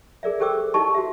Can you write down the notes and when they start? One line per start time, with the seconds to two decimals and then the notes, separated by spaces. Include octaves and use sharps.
0.23 G#4 A#4 D5 E5
0.40 G4 A4 C5 G5 D6 E6
0.74 D#4 E4 G4 D#5 A5 C#6
0.94 F#4 G4 E5